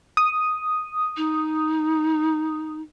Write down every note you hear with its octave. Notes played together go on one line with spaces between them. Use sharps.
D#6
D#4